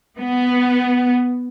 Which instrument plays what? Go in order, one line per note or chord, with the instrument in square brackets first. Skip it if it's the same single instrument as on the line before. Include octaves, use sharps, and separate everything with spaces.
[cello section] B3